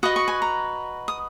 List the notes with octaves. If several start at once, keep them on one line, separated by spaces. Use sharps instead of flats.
F#4 B4 D#5 D#6
C#6
G#5
A#5
D#6